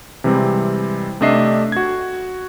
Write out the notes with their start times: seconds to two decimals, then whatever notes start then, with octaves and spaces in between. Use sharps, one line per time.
0.24 C3 E3 G3 G#3 C4
1.21 C3 A3 D4 D#5 E5 C7
1.72 F#4 G#6